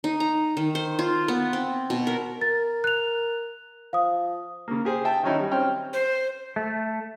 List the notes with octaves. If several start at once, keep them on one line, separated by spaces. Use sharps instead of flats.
D#4
A#5
D#3
C5
F4
B3
C4
B2
A#4
A#4 A6
F#6 F7
F3 F5 D#6
C#3 A#3
G4 G#4 C5
E5 G5 A5
D#3 F#3 C#4 D#4 E4
G3
C4 C#4 G5 F6
C5
A3